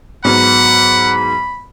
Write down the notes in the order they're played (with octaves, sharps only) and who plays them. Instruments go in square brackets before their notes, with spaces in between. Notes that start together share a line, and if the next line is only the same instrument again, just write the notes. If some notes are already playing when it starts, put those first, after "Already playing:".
[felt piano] G#2 F#3 B3 [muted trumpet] F#5 [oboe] B5